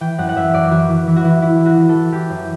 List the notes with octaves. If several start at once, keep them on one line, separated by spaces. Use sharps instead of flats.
E3 G5
F#2 F#5
F#5
F#2 E5
F#2 D5
E3 F#4
E3
E3 E4
F#4
E3 E4
E3 E4
E3
F#4
E3
A4
E3
E3 G4
F#2